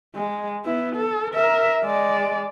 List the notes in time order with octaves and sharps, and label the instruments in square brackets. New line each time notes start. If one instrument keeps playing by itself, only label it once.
[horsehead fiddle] G#3
B3 E4
A4
A#4 E5
G#3 D5